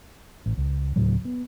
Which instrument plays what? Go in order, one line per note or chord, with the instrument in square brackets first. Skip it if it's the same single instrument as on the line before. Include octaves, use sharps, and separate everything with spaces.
[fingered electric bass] A1
C#2
D2 A2 C#3 F#3
B3